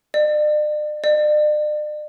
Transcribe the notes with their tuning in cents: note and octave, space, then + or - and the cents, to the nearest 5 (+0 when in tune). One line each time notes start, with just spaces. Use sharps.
D5 +40
D5 +40